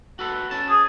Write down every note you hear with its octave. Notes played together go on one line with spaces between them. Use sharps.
F#4 A4 B4
C#4 A5
G#4